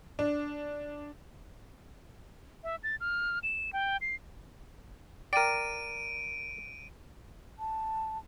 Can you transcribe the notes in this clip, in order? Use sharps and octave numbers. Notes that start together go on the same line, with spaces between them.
D4
E5
A6
F6
E7
G5
C7
A#4 D5 G5 D7 D#7
A5